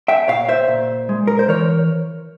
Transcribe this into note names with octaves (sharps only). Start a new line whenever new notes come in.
E5 G5
A#2 C#5 F5
C5 E5
A#2
G#3
A#4
C5
E3 A#4 C#5